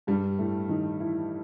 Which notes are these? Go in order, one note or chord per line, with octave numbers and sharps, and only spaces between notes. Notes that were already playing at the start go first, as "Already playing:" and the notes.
G2 G3
A2 A3
D#3 D#4
E3 E4